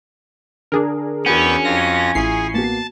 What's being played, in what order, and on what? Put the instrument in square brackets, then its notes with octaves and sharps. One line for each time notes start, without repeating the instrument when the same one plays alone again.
[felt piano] D3 [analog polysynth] D4 G#4 A#4
[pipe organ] E2 B3 G5 [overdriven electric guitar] C#4 [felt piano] F#4 F#5
[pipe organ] F2 F4 A#6
[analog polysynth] A1 C7 [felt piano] E4 F4 C#6 [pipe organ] G#4
[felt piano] A#3 B3 F#4 [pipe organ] A5